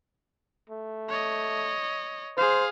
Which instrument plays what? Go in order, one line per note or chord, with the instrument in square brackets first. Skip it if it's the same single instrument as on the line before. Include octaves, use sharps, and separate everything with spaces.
[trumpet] A3
[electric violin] C#5 D#5
[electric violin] G#4 F5 [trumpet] C5